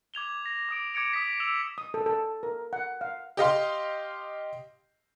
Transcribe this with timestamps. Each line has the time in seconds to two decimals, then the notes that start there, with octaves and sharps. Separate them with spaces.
0.14 D6 G#6 F7 G7
0.46 A#6
0.69 D6 D#6 D7
0.94 D6 G#6 C#7 D7 F7
1.13 D#6 A#6 B6
1.40 E6 E7 F7
1.78 D#6
1.94 A4
2.06 A4
2.43 A#4
2.73 F#5
3.01 F5
3.37 G4 D#5 F5 C6